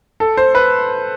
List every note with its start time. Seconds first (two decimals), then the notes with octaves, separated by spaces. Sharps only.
0.20 A4
0.37 C5
0.55 B4